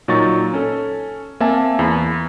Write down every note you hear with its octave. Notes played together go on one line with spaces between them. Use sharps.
A#2 F#3 D#4 C#6 A6
C#4 A4
A#3 C4 E5 G#5 A5
E2 B5